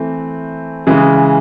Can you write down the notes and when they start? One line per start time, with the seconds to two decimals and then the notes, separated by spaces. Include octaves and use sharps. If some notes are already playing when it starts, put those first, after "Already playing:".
Already playing: E3 A3 C4
0.87 C#3 E3 G#3